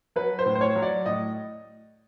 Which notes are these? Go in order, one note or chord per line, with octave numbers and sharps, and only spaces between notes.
F#3 B4
C5
A2
C5
C#5
F#3
D5
A2 D#5